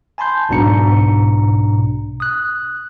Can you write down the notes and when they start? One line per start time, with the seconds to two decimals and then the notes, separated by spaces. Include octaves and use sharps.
0.18 G#5 A5 B5 C6 G6
0.49 B1 G#2 B2 D4 A#5 C#7
2.20 D#6 F#6